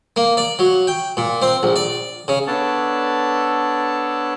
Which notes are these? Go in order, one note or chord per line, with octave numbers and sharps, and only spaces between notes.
A#3
D5
F#3
G5
A#2
C4
A#1
D5
C#3
B3 D4 A4 C#5 D5 A5